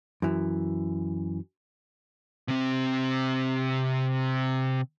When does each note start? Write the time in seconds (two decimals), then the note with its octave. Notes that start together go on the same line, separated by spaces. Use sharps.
0.22 F#2 E3
2.48 C3 C4